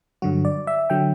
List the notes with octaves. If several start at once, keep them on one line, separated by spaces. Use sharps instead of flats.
G2 D3 F#3 F#4
D5
E5
D3 F#3 G5